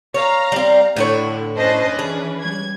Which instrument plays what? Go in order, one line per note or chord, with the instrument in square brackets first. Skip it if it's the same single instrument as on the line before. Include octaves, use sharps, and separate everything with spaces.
[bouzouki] C#5 [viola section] F5 A#5
[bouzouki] G3 C4
[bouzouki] A2 E4 C#5 [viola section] D3
[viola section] C#4 D4 B4 [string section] C5 D#5 A5
[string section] E3 [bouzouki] G#4
[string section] G3 G#6